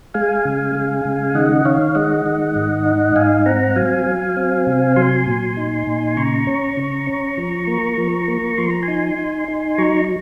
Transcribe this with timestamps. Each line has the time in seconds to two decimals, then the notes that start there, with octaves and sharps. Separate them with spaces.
0.14 G#3 F5 G#5
0.45 C#3
0.75 G#3
1.05 C#3
1.35 D#3 D#5 F#5
1.65 D#3 C#5 F5
1.95 G#3 D#5 F#5
2.26 D#3
2.55 G#2
2.86 D#4
3.16 G#2 F5 G#5
3.46 C4 F#5 A#5
3.76 F#3 F5 G#5
4.06 F#3
4.37 C4
4.67 C3
4.96 F#3 G#5 C6
5.26 A#2
5.57 D#4
5.87 A#2
6.17 C#3 A#5 C#6
6.47 C#4
6.77 C#3
7.07 C#4
7.37 F3
7.67 A#3
7.98 F3
8.28 A#3
8.58 F3 C6
8.70 A#5
8.83 G#5 C6
8.88 D#4
9.18 D#4
9.48 D#4
9.78 F#3 A#5 C#6